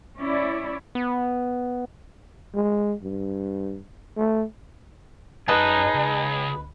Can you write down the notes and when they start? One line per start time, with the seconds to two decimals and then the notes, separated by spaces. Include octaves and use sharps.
0.19 C#4 E4 D5
0.95 B3
2.55 G#3
3.03 G2
4.17 A3
5.48 F#2 D#4 G#4 B4 D#5 A5
5.94 C#2